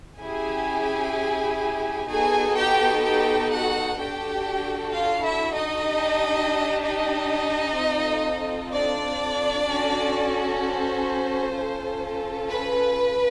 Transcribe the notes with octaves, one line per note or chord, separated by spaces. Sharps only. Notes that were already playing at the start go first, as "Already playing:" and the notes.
C#4 E4 G4 G#4 G#5
B3 D#4 F#4 G#4 A4 G#5
G4 G5
G4 G5
F#4 F#5
D4 F#4 G4 A4 G5
F4 F5
E4 E5
D#4 D#5
D4 G4
D#4 D#5
C4 F4 A4
D4 D5
C#4 F#4 A4
C5
C#4 F4 A4
B4